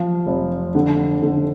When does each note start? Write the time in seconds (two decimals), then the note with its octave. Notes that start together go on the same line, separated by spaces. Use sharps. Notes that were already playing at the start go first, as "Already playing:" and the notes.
Already playing: F3 F5
0.26 F1
0.75 D3 F#5
1.22 D3